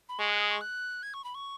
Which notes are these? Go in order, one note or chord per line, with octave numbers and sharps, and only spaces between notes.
B5
G#3 C#6
F#6
D#6
C#6
F#6
G#6
C#6
B5
C#6